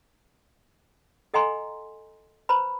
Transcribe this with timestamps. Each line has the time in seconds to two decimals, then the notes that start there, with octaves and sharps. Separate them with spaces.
1.34 A4 D#5 F#5 G#5 A#5 C6
2.49 B4 C5 A#5 B5